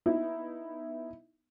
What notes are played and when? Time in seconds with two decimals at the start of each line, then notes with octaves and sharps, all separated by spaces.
0.06 B3 D#4 E4